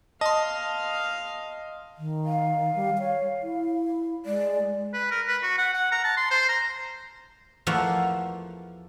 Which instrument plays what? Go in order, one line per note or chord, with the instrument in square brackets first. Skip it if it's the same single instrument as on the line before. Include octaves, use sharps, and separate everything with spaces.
[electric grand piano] D#5 [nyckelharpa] F5 [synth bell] A5 C6
[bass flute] D#3
[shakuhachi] F5
[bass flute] G3
C#5
E4
[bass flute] G#3 [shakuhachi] D5
[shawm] B4
A#4
B4
F#4
F#5
F#5
A#5
A5
C6
C5
A#5
[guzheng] E2 F3 A3 A#3 F4 F#5